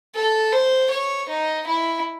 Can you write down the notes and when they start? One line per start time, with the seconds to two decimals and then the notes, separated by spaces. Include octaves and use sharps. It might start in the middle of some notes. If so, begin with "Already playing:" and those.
0.15 A4
0.52 C5
0.91 C#5
1.29 D#4
1.67 E4